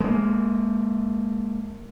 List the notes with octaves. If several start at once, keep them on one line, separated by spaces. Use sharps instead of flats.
G#3 A#3